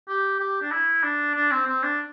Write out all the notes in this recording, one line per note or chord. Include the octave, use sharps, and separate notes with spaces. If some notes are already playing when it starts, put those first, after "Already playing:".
G4
G4
D4
E4
D4
D4
C4
C4
D4